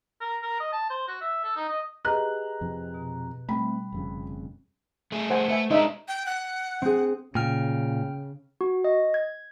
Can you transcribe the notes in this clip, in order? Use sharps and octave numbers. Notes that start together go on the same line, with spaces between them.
A#4
A#4
D#5
A5
C5
F#4
E5
A4
D#4
D#5
G4 G#4 B4 D#5 A#5 F#6
F2 C3 F3
B2
G3 A3 C4 B5
F1 F2 C#3
A3 G#4
C5 F#5 G#5
A3 B4 E5 G#5
G#3 D4 D#4 D#5 E5
G5
F#5
C4 G#4
A#2 C#3 G5 F6
F#4
D#5
G#6